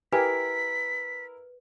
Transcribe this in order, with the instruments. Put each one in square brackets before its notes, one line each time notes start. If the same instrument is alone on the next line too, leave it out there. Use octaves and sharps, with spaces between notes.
[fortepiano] E4 A#4 [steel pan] G4 G#5 [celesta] B4 [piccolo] B6